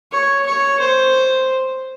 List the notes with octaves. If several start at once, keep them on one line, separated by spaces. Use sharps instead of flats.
C#5
C#5
C5